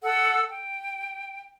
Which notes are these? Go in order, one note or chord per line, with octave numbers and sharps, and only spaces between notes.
A4 F#5 E6
G5